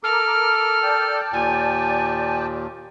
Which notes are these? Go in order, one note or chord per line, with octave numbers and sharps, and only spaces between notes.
A4 A#4 D6 F6
D5 G5 A5
D#2 A#2 G#5